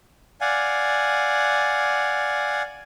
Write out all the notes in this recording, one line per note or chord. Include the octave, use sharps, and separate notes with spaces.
D5 F5 F#5 G#5